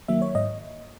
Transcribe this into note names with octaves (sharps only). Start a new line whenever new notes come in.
D#3 F#3 A#3 E5
C#5
G#2 D#5